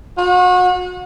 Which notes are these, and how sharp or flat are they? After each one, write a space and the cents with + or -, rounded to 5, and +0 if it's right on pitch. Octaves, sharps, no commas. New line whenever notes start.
F#4 -35